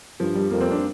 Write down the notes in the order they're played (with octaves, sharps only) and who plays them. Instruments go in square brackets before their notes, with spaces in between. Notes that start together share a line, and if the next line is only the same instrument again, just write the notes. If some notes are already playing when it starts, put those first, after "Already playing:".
[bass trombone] G2 [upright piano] F3
[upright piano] G3
[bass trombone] F2 [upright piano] A#3
[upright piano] C4
D4